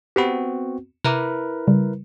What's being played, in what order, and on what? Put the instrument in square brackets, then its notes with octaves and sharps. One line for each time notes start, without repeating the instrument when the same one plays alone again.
[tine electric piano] B3 C4 F#4 [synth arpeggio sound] G4 B5 D7
[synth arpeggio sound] C3 A#5 D6 [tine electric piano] E4 A#4 B4
[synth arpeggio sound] C#3 G3